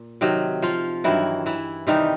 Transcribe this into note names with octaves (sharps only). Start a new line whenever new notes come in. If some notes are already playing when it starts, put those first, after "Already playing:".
Already playing: A#2
C3 D#3 F#3
F3 F4
G2 D#3 E3 F#3 E4
E3 E4
C3 D#3 E3 G3 D#4